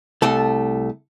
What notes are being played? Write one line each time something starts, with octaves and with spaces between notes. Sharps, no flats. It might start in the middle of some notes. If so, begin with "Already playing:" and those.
C2 A3 A4